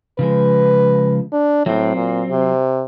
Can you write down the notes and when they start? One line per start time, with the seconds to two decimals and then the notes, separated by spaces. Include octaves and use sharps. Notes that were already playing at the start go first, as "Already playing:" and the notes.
0.19 C#3 F3 G#3 B4
1.33 D4
1.66 A2 F#3 C4
1.96 A#2
2.31 C3